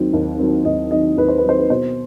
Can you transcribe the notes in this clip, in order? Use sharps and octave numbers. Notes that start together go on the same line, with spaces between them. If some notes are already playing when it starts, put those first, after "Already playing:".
Already playing: D#2 D#3 F#3 C4
D#2
D#3 F#3 C4
D#2 D#5
D#3 F#3 C4 D#5
D#2 B4
C5
B4
D#3 F#3 C4 C5
B4
B2 C5